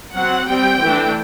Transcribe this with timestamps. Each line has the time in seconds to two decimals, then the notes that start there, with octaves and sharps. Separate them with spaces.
0.14 F#3 C4 F#5
0.48 G3 C4 G5
0.81 E3 A3 D4